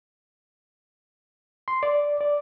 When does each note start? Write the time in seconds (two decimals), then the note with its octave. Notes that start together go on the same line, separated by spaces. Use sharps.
1.68 C6
1.83 D5
2.21 D5